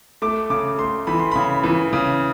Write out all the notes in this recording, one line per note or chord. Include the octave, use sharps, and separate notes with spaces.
A3 D6
C#3 D6
A3 C6
E3 B5
C6
C#3 B5
E3
C#3